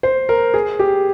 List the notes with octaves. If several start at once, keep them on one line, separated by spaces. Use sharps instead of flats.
C5
A#4
G#4
G4